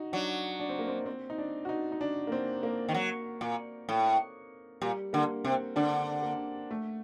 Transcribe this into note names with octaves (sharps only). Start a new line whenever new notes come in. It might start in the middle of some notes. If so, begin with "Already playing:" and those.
Already playing: D#4 F#4
F#3 D4
D4
C4
A#3
C4
C4
D#4
D4
F#4
D#4
D#4
D4
A#3
C4
A#3
D#3
F#3
A#2
A2
A#2 G3
D3 A#3
C3 C4
D3 D4
A#3
A3